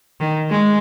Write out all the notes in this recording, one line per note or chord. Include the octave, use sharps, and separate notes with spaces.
D#3
G#3